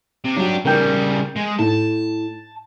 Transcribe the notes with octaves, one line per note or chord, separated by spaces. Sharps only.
C3
F#3 D4 G4
C#3 G3 A#4 G5 G6
G#3
A2 A5